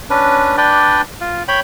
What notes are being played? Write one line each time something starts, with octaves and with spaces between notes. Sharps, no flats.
C#4 D4 B4
D4 B4 D5 G5
F4
C#5 G5 B5